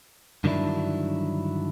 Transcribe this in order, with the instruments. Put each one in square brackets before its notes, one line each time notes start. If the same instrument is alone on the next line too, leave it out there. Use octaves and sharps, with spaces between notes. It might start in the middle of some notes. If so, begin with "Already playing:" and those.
[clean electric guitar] G2 D3 D#3 F#3 D4 E4